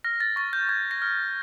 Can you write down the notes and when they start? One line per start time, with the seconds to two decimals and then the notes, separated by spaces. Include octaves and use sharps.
0.04 F6 A#6
0.20 A6
0.36 C#6 A6
0.53 G6
0.69 C#6 G#6
0.91 A#6
1.02 F6